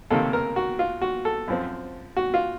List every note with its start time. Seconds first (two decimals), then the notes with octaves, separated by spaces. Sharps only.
0.10 C#2 C3 D#3 A#3 A4
0.33 A#4
0.56 F#4
0.79 F4
1.02 F#4
1.25 A4
1.48 F#2 F3 C4
2.17 F#4
2.34 F4